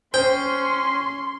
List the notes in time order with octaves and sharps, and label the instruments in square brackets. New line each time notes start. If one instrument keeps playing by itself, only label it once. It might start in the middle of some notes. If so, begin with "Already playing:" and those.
[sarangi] C#4 [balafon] C5 [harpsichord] G5 [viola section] C6